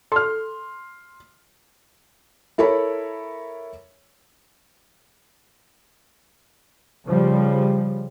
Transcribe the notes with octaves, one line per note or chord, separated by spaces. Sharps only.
A4 C6 F6
E4 A4 A#4 C#5 B5
C#3 F3 G3